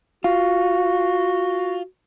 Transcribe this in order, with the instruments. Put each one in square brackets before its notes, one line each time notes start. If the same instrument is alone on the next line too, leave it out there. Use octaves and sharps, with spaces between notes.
[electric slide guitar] F4 [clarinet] F#4